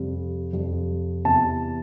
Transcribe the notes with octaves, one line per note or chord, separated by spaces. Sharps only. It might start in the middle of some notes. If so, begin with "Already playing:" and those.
Already playing: F2 C3 G3
F2 C3 G3
E2 C3 E3 A5